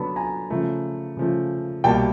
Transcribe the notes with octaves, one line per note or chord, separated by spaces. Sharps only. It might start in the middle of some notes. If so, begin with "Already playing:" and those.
Already playing: D3 F#3 B3 A5 B5
G#5 A#5
C#3 F3 A3
C#3 F3 A3
C2 B2 G3 A#3 G5 A5